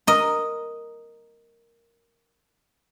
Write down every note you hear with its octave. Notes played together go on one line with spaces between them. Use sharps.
A#4 D#5